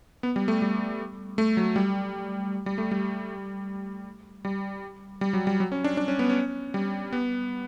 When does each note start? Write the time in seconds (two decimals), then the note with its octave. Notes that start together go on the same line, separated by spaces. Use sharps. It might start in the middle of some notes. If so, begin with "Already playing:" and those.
0.23 B3
0.36 G3
0.48 A3
0.62 G3
1.38 A3
1.57 F#3
1.76 G3
2.66 G3
2.78 A3
2.91 G3
4.45 G3
5.21 G3
5.33 F#3
5.47 G3
5.60 F#3
5.72 C#4
5.84 D4
5.97 D4
6.08 C#4
6.19 B3
6.29 C#4
6.74 G3
7.13 B3